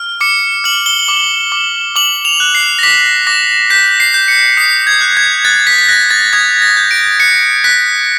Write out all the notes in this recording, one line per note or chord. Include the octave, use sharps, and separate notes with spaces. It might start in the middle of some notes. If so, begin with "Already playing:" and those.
Already playing: F6
D6 C#7
F6 F#7
G7
D6
D6
D6 F#7
F7
F#6
C7
A#6
D6 B6
D6 A#6
G6 B6
C7
G6
C#7
D#6 C7
G#6
F#6
G#6
F#6 A6
B6
B6
F#6 A#6
A6
D#6 G#6
A#6
G6
D7
F#6 C#7
F#6 B6